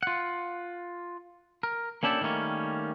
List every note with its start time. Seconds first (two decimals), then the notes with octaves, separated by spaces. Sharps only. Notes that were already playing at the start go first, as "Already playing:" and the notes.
0.03 F4 F#5
1.63 A#4
2.03 A#3 C#4 D4 E4 G4 A4
2.21 D#3 G3 A3 A#3 C#4